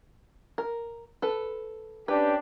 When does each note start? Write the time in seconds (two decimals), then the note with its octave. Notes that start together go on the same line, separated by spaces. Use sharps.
0.58 A#4
1.22 A4 B4
2.08 C#4 D4 G4 B4